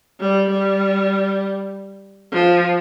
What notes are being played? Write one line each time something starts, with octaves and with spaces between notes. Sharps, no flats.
G3
G3
F3